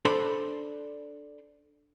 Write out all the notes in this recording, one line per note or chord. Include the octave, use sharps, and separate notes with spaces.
D4 A4 C5 D5 B5 C6